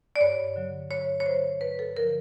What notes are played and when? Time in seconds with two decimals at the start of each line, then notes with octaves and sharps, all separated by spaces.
0.16 D5
0.21 G2 C#5
0.56 D3 F#3
0.90 G2 C#5
1.20 C#5
1.26 D3 F#3 C5
1.60 G2 B4
1.79 A4
1.96 D3 F3 A#4